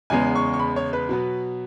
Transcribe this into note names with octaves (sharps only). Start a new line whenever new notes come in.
E2 C#3 G#3 B3 G#5
C#6
C#6
B5
C#5
B4
B2 F#3 B3